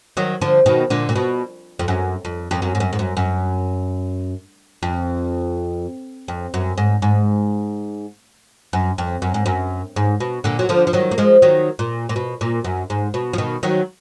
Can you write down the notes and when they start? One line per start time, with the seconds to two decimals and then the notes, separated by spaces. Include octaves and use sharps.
0.17 D#3 F#3
0.41 D3 F3
0.66 B2 D#3
0.90 A#2 D3
1.09 A#2
1.16 B2
1.79 F2
1.88 F#2
2.25 F2
2.51 F2
2.62 F#2
2.75 G#2
2.80 F#2
2.93 G#2
2.99 F#2
3.17 F#2
4.83 F2
6.28 F2
6.54 F#2
6.78 G#2
7.02 G#2
8.73 F#2
8.98 F2
9.22 F#2
9.34 G#2
9.46 F#2
9.96 G#2
10.20 B2
10.44 A#2 D3
10.59 F#3
10.69 D3 F3
10.87 F3
10.93 D#3 F#3
11.11 A#3
11.18 F3 G#3
11.42 D#3 F#3
11.79 A#2
12.09 A#2
12.16 B2
12.41 A#2
12.64 F#2
12.90 G#2
13.14 B2
13.33 F3
13.38 B2 D#3
13.63 D#3 F#3